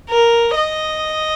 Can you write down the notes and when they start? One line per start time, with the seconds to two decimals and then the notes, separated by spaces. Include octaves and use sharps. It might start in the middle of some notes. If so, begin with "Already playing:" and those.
0.10 A#4
0.56 D#5